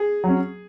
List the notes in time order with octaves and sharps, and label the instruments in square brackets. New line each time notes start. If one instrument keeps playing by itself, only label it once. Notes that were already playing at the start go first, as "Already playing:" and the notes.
Already playing: [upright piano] G#4
[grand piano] F#3 C#4